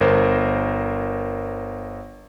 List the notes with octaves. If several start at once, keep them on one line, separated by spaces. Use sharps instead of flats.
G1 A#4 C5